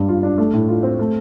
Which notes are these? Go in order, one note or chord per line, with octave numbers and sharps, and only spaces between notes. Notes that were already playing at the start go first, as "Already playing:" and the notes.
Already playing: G2 G3
F4
D4
A3
A2
F4
C4
A3